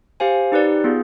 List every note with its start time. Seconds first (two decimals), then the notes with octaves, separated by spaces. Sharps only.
0.20 G4 C5 F5 G#5
0.52 D#4 G4 B4 D5
0.84 B3 F4 G#4